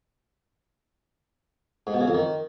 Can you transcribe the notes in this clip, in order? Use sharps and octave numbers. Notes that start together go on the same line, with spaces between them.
G#2
B2
C#3
F2
D#3